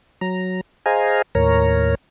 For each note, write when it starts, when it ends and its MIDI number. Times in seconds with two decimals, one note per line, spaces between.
0.21 0.61 54
0.21 0.61 82
0.86 1.22 68
0.86 1.22 72
0.86 1.22 75
0.86 1.22 77
0.86 1.22 80
0.86 1.22 82
1.35 1.95 39
1.35 1.95 45
1.35 1.95 70
1.35 1.95 73
1.35 1.95 82